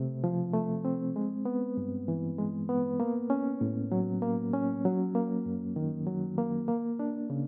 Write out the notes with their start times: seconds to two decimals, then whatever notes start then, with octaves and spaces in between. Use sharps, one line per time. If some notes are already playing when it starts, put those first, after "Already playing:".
Already playing: C3 A3 C4
0.24 F3
0.53 A3
0.85 C4
1.16 G#3
1.45 B3
1.77 G2
2.08 E3
2.38 G#3
2.69 B3
3.00 A#3
3.30 C#4
3.61 A2
3.92 F#3
4.22 A#3
4.53 C#4
4.85 F#3
5.15 A#3
5.46 F#2
5.76 D#3
6.07 F#3
6.38 A#3
6.68 A#3
6.99 D4
7.30 C#3